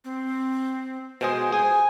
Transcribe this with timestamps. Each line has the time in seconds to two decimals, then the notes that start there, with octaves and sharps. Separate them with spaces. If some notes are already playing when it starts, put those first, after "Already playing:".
0.05 C4
1.21 B2 G#3 G#4 C5
1.52 G#4 G#5